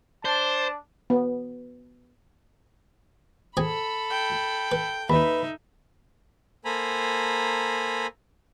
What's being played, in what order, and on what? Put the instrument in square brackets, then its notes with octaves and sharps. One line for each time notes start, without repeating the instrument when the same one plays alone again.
[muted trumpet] D4 [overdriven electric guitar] C5 [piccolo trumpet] A5
[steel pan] B3
[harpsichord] C4 G#4 G#5 [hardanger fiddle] A4 B5
[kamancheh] G5
[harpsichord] B4
[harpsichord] D#2 [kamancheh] D#4 E5 [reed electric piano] B4 B5
[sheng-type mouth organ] A#3 A4 C5 G#5 A#5 B5